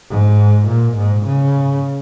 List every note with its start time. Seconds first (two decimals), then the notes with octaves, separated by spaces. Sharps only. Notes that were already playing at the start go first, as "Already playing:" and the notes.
0.10 G#2
0.68 A#2
0.98 G#2
1.26 C#3